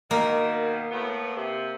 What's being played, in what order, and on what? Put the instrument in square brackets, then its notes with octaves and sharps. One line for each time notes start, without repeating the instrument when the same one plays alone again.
[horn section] B2 D#3 [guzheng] A#3
[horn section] A2 B3
C3